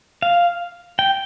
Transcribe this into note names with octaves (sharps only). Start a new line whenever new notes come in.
F5
G5